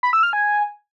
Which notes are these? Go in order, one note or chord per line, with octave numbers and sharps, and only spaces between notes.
B5
E6
F6
G#5